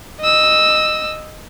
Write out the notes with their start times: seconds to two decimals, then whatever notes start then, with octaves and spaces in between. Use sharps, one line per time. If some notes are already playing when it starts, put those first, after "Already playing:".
0.20 D#5 E6